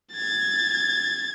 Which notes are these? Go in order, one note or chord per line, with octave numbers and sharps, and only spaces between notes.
G#6 A6